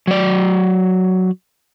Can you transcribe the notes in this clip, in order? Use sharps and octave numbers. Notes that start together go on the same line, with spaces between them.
F#3 D5